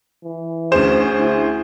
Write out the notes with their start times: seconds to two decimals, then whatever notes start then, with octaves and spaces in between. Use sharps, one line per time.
0.23 E3
0.72 D2 C#4 G#4 C5 E7
1.20 E4